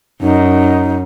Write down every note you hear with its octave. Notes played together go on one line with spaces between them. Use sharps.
F#2 D#4